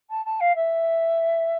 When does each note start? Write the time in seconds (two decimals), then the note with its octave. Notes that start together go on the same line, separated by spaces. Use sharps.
0.09 A5
0.25 A5
0.40 F5
0.55 E5